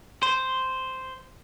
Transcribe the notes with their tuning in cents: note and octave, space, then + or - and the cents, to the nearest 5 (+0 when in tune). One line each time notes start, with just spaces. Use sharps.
C5 -5